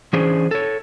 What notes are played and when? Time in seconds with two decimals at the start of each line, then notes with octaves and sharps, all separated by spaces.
0.13 E3 C#4 D4 G#4 C5
0.51 A4 C#5